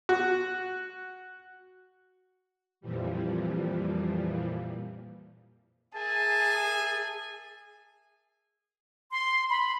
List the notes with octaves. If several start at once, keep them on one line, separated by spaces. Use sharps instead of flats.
F#4
F2 A#2 E3 F3 G3
G#4 A#4 E5 G#5 A5
C6
B5